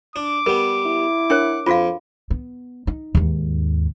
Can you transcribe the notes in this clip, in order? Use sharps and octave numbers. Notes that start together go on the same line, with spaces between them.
D4 D6
G3 B3 A#4
E4
D4 A#4 C#5 F#5
F2 F4 F#4 F5
B3
D#4
D#2 G#2